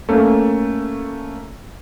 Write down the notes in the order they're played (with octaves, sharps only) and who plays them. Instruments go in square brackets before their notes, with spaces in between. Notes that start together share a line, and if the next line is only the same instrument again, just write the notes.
[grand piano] A3 A#3 C#4 A4